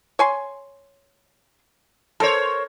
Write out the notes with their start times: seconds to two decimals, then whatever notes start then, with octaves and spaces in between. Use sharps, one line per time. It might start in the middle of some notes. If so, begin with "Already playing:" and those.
0.19 C#5 G#5 C6
2.20 A4 A#4 C5 C#5